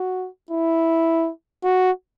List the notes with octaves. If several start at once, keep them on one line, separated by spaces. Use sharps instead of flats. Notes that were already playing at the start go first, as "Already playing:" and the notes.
Already playing: F#4
E4
F#4